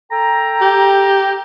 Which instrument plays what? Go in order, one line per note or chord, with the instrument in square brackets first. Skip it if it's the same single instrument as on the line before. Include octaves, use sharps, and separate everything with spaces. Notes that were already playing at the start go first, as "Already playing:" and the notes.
[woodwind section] A4 G5 A#5
[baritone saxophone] G4